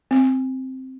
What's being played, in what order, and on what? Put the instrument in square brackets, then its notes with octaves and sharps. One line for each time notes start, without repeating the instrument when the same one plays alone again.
[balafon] C4